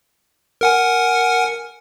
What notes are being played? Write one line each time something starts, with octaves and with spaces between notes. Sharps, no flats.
A#4 F#5 G#5